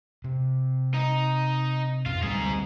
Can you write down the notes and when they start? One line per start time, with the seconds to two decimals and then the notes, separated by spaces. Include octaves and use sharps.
0.24 C3
0.94 D#4
2.06 F2 G#2 F4
2.22 D2 G3 C4 D#4 G#4